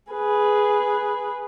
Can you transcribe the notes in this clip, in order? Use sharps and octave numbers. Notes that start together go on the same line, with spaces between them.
G#4 B4